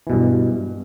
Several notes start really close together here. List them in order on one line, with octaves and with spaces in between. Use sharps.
E3 B2 G2